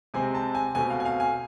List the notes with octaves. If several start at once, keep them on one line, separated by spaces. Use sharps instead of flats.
C3 G#3 C4 G#5
A5
G#5
B2 A3 C4 G#5
F5
G#5
F5
G#5